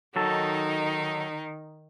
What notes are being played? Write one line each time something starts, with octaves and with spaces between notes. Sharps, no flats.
D#3 F#3 D#4 A4